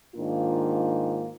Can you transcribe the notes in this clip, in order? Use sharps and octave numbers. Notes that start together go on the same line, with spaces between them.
G#2 D#3 A#3 D4 F4